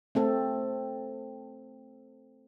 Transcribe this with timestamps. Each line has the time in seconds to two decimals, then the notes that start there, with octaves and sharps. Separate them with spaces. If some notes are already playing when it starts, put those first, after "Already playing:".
0.15 A3 C4 A4